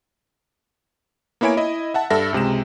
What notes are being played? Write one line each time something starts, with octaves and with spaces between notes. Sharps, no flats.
A#3 B3 E4 C#5 G#5 D7
E4 D#5
E5 F#5 A5
G2 A4 E5 A#6
C#2 C3 G#3 E7